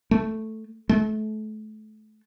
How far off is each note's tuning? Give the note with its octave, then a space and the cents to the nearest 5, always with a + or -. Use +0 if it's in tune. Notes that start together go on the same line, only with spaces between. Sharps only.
A3 +0
A3 -30